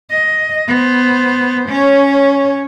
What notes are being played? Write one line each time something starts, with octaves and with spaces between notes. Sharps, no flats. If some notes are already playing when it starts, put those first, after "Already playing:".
D#5
B3 C5
C#4 C#5